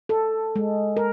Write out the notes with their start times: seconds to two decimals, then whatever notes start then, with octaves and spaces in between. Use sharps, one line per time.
0.09 A4
0.56 G#3
0.97 A#4